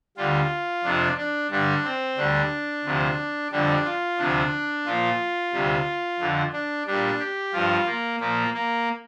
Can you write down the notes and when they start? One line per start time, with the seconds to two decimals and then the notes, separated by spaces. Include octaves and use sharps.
0.17 D2 D3 G3 F4
0.84 F2 C3 F3 D4
1.17 D4
1.50 G2 D3 G3 D4
1.84 C4
2.17 D2 D3 G3 D4
2.85 D2 C3 F3
3.52 F2 D3 G3 D4
3.85 F4
4.18 D2 C3 F3 D4
4.86 A#2 F3 F4
5.53 D2 C3 G3
6.19 F2 D3 F3
6.53 D4
6.87 A#2 G3 D4
7.19 G4
7.53 G2 F3 F4
7.86 A#3
8.20 A#2 F3 A#3
8.54 A#3